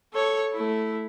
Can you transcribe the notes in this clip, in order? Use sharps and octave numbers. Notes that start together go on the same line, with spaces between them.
A4 C#5
A3 E4